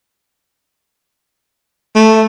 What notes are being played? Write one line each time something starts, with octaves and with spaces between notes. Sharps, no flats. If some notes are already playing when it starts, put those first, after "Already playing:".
A3